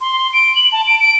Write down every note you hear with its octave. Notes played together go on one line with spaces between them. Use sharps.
C6
D7
F#7
A5
D7
D7